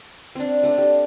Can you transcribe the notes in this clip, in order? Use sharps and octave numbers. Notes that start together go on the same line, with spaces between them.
C4 D4
A3 D4
G4